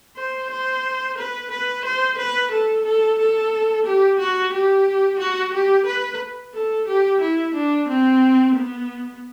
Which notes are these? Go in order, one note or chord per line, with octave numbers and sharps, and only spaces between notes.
C5
C5
B4
B4
C5
B4
A4
A4
A4
G4
F#4
G4
F#4
G4
B4
A4
G4
E4
D4
C4
B3